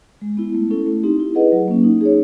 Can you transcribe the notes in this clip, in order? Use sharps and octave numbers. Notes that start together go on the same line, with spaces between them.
G#3
B3 E4
A3
C#4 E4 A4
A3
C4 D#4 G4
E4
G#4 B4 D#5 F#5
F#3
A#3 C#4
D#4
G#4 C#5